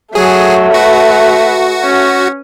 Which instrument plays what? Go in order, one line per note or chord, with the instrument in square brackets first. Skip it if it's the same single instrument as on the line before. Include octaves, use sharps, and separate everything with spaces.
[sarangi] F#3 [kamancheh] A3 [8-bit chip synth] G#4
[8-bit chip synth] F#4 [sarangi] B4
[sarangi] C#4